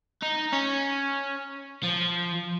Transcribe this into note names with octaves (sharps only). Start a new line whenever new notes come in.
D#4
C#4
F3